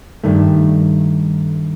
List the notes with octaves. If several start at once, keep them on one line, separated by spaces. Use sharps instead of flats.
G2 D#3 A3